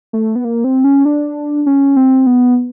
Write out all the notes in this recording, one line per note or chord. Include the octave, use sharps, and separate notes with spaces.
A3
B3
A#3
C4
C#4
D4
C#4
C4
B3